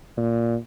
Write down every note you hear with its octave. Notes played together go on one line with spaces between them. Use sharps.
A#2